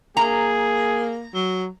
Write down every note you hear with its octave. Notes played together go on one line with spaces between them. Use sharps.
A#3 G#4 A#5
F#3